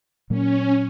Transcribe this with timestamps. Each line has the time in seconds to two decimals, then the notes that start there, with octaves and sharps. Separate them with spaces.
0.30 A#2 F#3 A#3 C#4